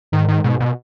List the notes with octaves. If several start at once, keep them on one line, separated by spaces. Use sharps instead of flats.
G#2 D#3
D#3
G#2 B2
B2